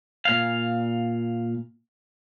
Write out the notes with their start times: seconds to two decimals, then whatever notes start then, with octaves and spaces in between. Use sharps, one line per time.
0.25 A#2 F5